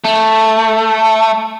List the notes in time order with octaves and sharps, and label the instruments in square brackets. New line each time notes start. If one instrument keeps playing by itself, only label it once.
[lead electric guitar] A3